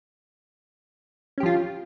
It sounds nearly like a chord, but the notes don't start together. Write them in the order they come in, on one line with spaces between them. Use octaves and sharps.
C#4 G4 F3 F4